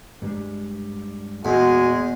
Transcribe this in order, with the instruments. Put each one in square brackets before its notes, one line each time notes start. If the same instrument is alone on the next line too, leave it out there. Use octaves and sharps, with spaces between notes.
[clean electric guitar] G2 G3 G#3
[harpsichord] E2 [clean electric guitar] A#2 [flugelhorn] G#3 [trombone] F#4